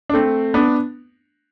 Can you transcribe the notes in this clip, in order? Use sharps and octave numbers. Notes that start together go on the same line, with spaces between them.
D4
A3 C4
B3 D4